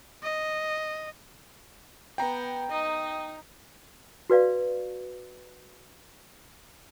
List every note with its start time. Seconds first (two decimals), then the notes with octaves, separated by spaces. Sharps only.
0.23 D#5
2.18 B3 G5 A#5
2.70 D#4 D#5
4.30 F#4 B4 D5 F5